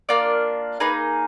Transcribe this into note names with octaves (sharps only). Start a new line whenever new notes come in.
A#3 D4 F4 D5
A#3 D#4 G#4 B4